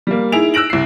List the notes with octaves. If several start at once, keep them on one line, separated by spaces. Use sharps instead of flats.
G3 A#3
D#4 E4 G#4 D7 F7
E6 F#6 A#6 D7 F#7
C2 C7